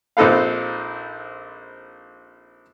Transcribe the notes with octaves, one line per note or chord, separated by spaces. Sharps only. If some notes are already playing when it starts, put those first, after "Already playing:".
A#1 C4 D#4 A4 B4 F5